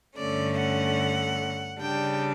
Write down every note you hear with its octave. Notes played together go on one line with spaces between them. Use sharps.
G2 D3 A3 C#4 D5
F#5
C#3 G3 D4 G5